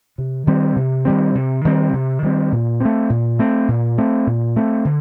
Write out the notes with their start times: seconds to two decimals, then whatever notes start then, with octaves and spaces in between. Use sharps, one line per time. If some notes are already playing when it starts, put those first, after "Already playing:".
0.18 C3
0.47 D#3 G3 C4
0.76 C3
1.05 D#3 G3 C4
1.35 C3
1.65 D#3 G3 C4
1.93 C3
2.23 D#3 G3 C4
2.52 A#2
2.80 A3 C4
3.10 A#2
3.39 A3 C4
3.68 A#2
3.98 A3 C4
4.27 A#2
4.56 A3 C4
4.85 D3